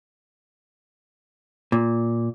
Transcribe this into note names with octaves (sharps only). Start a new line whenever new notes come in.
A#2